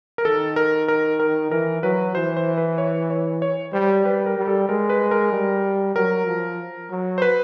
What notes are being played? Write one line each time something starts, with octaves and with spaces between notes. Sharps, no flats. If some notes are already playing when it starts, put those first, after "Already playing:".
A#4
D#3 A4
A#4
A#4
A#4
E3 A#4
F#3 B4
E3 C5
C5
B4
C#5
C#5
C#5
G3 C5
G3 B4
A#4
G3
A4
G#3 A#4
B4
A#4
G3
F#3 A#4
F3
F#3
C5
B4